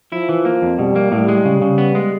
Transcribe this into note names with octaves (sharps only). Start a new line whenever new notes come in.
F3 E4
E3
A#3
F2
B2 G3
A#3
A2 G3
G#3
C#3
C#3
B3
G#3